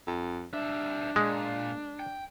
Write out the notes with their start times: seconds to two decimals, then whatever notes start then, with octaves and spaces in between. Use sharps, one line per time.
0.07 F2
0.54 G3 D4 E5
1.16 A#2 G#3
2.00 G5